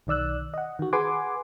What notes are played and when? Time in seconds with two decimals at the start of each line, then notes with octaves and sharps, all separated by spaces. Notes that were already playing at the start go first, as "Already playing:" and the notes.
0.07 B1 D#3 D5 E6 F#6
0.54 D#5 F#5
0.79 D#3 F#4
0.93 G#4 B4 F#5 G#5 C6 D6